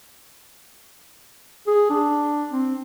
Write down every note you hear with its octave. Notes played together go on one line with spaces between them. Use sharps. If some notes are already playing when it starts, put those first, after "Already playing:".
G#4
D4
C4